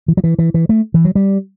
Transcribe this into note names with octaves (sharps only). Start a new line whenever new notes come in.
E3
F#3
E3
E3
E3
A3
E3
F#3
G3